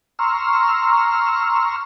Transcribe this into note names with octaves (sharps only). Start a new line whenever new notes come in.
A#5 C6 C#6 E6 F6